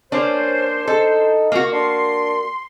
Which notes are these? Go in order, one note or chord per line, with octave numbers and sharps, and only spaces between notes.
A#3 C#4 D4 C5
D#4 A4
A#3 F#4
D4 C6